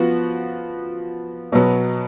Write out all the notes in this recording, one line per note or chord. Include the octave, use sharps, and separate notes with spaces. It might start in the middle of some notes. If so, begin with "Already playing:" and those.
Already playing: F3 B3 F#4
B2 F#3 B3